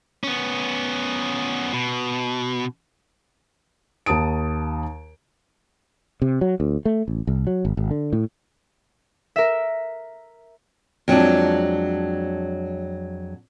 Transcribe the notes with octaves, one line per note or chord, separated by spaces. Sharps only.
B3 C#4
B2
D#2 A5 D#6 D7
C3
F#3
D2
A3
A1
C2
F#3
G#1
G#1
D3
A2
A#4 E5
F2 F#3 G#3 D4